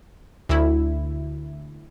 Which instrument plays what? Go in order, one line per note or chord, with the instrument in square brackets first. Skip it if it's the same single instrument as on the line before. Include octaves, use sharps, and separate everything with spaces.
[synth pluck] D2 E4